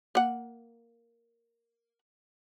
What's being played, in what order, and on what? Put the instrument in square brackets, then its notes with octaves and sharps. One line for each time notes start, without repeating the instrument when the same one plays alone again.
[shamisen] A#3 F#5